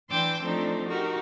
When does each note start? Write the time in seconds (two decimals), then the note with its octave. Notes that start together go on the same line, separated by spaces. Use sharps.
0.11 E3 D4 G5 C6 D6 E6
0.43 F3 A3 C4 D4 D#4
0.88 D#4 F#4 G4 A#4